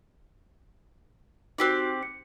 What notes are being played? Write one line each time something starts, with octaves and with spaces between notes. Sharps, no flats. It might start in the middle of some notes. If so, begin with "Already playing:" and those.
C4 D#4 F#4 G4 D5 F#6
C#7